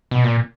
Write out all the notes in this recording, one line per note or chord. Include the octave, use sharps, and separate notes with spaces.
B2
A#2